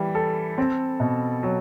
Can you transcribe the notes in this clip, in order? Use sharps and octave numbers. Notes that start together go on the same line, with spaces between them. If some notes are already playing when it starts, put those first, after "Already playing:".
Already playing: E3 G3
A4
C4
B2
F#3